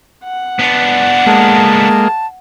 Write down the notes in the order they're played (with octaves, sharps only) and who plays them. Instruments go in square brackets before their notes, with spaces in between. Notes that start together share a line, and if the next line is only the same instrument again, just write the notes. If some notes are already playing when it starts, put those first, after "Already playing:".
[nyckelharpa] F#5
[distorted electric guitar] B3 D4
[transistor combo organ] G#3 A#3 [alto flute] A5